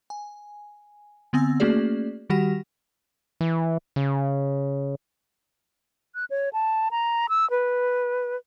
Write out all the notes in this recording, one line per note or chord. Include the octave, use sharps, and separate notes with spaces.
G#5
D3 B3 C4 G#5 E6
A3 A#3 C#4 F#4 G#4 D5
D#3 G3 F#4 G4 F#5 A#6
E3
C#3
F#6
C#5
A5
A#5
E6
B4